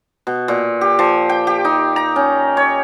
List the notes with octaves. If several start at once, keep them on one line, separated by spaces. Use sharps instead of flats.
B2
A#2
G4
F3
G5
G4
D#4
A#5
C#4
C#5